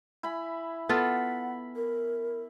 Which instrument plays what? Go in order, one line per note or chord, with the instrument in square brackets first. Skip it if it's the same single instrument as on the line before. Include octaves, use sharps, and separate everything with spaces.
[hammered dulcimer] E4 G#5 B5
[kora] B3 F4 A4 [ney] F#5 [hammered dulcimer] B5
[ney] A#4